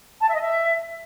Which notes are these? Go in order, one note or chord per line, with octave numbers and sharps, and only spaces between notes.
A5
E5
D#5
E5